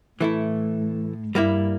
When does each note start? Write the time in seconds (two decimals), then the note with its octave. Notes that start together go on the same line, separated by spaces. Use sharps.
0.20 A2 E3 A3 E4
1.35 G2 G3 A#3 E4